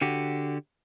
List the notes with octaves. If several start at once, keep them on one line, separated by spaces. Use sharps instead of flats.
D3 F#4 G4